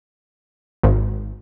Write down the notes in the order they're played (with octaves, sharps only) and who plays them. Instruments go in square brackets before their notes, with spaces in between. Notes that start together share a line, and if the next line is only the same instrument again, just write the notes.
[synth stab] G#1